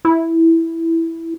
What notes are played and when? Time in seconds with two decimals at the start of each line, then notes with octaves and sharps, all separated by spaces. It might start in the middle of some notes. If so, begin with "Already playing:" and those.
0.05 E4